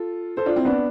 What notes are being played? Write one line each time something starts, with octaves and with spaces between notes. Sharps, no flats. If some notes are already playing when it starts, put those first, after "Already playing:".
Already playing: F4 A4
A4 C5
D4 F4
C4 E4
B3 D4